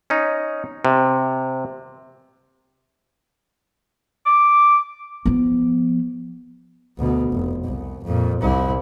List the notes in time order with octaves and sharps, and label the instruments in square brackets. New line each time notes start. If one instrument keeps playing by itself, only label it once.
[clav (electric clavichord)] C#4 D#4
C3
[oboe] D6
[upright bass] F3 B3
[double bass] D2 B2
F1
C2
F2 A#2
C2 E4